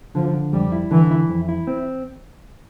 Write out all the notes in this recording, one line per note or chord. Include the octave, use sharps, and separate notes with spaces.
D3 F3
D3
F2 G3
E4
D3 E3
E4
F2
E4
C4